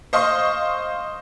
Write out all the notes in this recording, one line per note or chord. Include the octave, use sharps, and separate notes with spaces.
C5 D#5 F5 C6 C#6 D#6